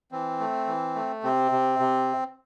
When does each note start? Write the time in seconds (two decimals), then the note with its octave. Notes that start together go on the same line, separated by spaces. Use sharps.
0.12 E3 C4
0.40 A3
0.67 E3
0.95 A3
1.23 C3 C4
1.52 C3
1.79 C3